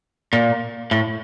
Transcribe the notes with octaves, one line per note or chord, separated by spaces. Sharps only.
A#2
A2